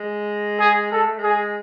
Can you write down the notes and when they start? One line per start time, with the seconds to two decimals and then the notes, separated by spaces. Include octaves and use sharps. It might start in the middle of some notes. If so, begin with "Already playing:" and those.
Already playing: G#3
0.60 G#4
0.92 G#3 A4
1.05 A3
1.18 G#3
1.24 G#4